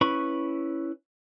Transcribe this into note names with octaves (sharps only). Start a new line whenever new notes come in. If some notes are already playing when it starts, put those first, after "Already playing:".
C#4 E4 B4 B5 C#6